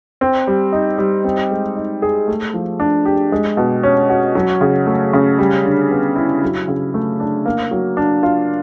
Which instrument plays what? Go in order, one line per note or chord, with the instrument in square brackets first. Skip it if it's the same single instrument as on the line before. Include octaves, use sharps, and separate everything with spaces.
[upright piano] C4
G3
D#4
G3
C4
G#3
D#4
G#4
A3
F3
D4
G4
G#3
B2
C#4
F#4
F#3
C#3
A3
C#3
G3
D3
B3
E4
F#3
C#3
A3
D4
A#3
F#3
D4
F4